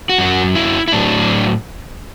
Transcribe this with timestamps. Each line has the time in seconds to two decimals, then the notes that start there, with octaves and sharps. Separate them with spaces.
0.09 F#4
0.18 F#2 F#3
0.55 E4
0.88 E4
0.92 A2 F#3 D4